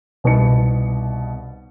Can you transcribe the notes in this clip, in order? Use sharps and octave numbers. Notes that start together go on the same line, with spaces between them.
C2 B2 D#4 C#7